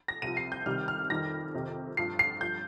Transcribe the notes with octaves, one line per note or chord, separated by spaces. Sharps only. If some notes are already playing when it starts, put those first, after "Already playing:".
A#6
C2 C3 F3 D#7
C7
G6
C2 C3 D#3 G3 F6
F6
F2 D#3 G3 A#6
F2 C3 D#3
G2 F3 C7
C7
G2 F3 G6